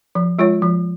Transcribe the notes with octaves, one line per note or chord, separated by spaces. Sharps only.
F3
G#3 F4 C#5
F3